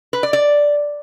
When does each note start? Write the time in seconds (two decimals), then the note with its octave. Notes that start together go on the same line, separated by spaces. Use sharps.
0.13 B4
0.23 D5
0.33 D5